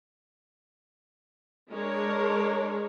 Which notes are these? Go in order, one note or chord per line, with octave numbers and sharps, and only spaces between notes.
G#3 D4 A#4 C#5